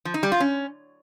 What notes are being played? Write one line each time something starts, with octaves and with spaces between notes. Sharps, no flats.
F3
D#4
G3
F4
C#4